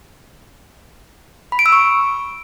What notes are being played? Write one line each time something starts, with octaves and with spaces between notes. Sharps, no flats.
B5
D7
E6
C#6